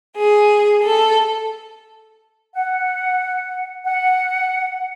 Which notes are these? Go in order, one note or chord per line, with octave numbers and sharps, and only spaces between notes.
G#4
A4
F#5
F#5